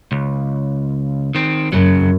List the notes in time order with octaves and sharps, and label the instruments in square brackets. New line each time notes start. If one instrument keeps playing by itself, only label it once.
[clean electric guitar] C#2
D#3 C4
[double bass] F#2 [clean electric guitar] C#3 F#3